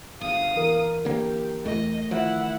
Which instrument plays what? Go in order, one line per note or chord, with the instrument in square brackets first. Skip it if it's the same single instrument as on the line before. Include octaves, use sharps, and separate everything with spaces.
[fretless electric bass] G1 [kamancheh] F5 D#6
[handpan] E3 A#4
[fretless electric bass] D3 A#3 [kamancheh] G4
[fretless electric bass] E2 [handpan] A3 [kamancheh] D#5
[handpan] D#3 [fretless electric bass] F3 [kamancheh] E4 F#5